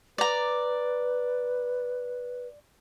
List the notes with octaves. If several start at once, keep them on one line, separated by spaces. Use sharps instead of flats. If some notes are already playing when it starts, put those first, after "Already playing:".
B4 D5 A#5